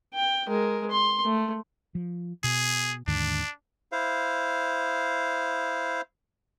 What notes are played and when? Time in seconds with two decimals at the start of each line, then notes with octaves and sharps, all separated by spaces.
0.14 G5
0.48 G#3 A#4
0.91 C6
1.25 A3
1.95 F3
2.44 B2 G#4
3.07 D#2 G#2 D3 D4
3.92 E4 C5 F5